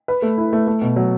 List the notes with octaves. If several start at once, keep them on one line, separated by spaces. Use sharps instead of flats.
B4
A3
E4
A3
A3
B2
F#3